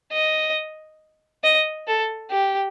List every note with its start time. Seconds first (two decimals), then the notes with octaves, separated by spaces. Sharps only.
0.13 D#5
1.44 D#5
1.88 A4
2.31 G4